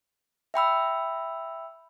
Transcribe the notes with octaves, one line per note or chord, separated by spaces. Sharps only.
E5 G5 B5 E6